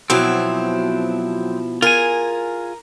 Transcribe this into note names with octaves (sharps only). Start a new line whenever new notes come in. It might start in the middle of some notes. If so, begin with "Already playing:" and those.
B2 F3 F#3 C4 E4
F4 G#4 A#4 G#5